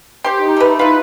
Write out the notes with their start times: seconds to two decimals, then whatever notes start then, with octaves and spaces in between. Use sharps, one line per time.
0.24 G4 C5 C6
0.40 D#4
0.57 A3 B4
0.79 E4 F4 B4